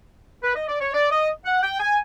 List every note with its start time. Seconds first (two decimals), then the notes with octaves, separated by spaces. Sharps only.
0.42 B4
0.55 D#5
0.68 D5
0.81 C#5
0.93 D5
1.11 D#5
1.45 F#5
1.63 G5
1.79 G#5